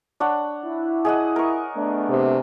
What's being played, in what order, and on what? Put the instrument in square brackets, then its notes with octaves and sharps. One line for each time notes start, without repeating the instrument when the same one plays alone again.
[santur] D4 C#5 F#5
[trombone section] E4
[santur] G#4 D#5 F#5
A#4 C#6
[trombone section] A3 B3 D4
[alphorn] C3